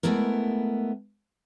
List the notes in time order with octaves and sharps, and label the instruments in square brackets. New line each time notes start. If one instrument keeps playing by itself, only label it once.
[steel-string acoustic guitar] G#3 A3 B3 E4 A#4